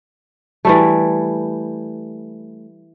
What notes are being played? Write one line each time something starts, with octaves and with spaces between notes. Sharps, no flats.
E3 G3 A3